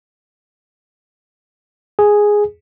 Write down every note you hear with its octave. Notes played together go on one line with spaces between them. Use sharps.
G#4